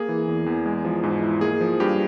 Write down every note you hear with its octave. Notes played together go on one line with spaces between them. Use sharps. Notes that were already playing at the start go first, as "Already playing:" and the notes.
Already playing: A#3 G#4
E3
E2
E2
G#3
F3
G#2
E4
A#3 G#4
F3
G2 G4